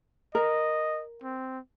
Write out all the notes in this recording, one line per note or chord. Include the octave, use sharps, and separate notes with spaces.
A#4 D#5
C4